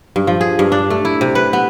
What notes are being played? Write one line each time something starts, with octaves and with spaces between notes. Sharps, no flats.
G2
F3
G#4
G2
D4
A3
E4
C3
B4
B3